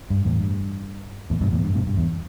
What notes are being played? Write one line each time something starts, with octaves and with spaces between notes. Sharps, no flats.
G2
E2 A2
G2
E2 A2
G2 B2
E2 A2
G2
G2 B2
G2
E2